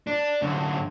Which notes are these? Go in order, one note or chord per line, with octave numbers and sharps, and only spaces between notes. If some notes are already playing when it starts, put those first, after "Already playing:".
D4
F#2 D3